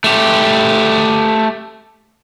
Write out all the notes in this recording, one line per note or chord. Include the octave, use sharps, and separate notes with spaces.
A3 G4